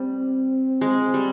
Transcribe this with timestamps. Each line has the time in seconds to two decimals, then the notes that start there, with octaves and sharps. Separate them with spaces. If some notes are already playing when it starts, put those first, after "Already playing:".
Already playing: G3 C4
0.81 G#3
1.14 G3